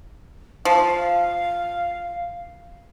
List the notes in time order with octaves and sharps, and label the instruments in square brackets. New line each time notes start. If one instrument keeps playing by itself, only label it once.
[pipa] F3 [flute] F5